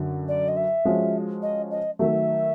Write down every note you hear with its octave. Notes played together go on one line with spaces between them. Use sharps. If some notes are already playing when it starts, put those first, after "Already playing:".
Already playing: F#2 D3 F#3
D5
D#5
E5
F3 G#3 C#4 F#4
D#5
D#5
D#3 F#3 A3 E5